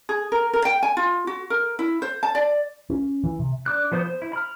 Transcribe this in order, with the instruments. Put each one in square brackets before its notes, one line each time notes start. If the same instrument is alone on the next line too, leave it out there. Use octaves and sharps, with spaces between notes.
[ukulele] G#4
A#4
A#4
G5
G#5
F4
F#4
A#4
E4
C5
A5
D5
[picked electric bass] C#4
E3
C3
[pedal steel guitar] D4 D6 F#6
F3 B3 C5 D#6 G6
C5
E4
B5 F6